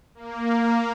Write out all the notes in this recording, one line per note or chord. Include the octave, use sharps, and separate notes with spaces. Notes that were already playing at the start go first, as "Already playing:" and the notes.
A#3